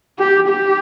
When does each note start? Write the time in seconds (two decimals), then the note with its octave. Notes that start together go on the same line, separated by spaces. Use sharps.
0.19 G4
0.48 G4